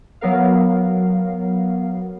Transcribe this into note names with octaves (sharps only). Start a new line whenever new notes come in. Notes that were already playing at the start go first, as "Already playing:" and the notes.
F#3 B3 A#4 F5